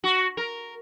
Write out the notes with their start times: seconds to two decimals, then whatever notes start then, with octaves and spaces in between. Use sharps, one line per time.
0.04 F#4
0.37 A#4